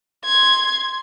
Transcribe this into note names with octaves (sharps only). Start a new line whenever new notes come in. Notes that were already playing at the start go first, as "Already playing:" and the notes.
C6 G#6